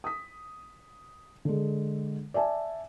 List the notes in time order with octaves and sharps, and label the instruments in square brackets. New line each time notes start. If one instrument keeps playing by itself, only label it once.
[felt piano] D#6 B6
D3 G#3
D5 E5 G#5 A5